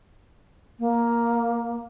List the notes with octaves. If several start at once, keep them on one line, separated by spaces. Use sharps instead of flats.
A#3